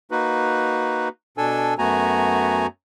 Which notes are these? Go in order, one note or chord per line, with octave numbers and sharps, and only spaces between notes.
A#3 D#4 F#4 B4
B2 D4 A4 G#5 E6
F#2 A3 B3 F#4 G#5 A#5